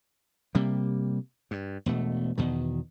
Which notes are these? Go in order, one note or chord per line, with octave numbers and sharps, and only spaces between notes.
C3 G3 A#3
G2
E1 B2 A3
E2 B2 D#3